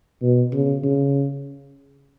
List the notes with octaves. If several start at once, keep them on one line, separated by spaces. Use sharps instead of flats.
B2
C#3
C#3